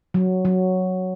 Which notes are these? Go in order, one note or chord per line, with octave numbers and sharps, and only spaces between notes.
F#3
F#3